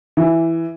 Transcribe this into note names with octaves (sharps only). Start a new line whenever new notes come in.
E3